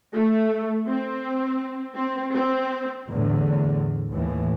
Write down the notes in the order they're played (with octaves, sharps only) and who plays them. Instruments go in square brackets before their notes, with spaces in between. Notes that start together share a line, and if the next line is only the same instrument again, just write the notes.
[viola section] A3
C4
C4
C4
[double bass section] E2 A2 D3
D#2 A2 E3